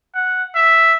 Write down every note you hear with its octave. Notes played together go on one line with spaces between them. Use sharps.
F#5
E5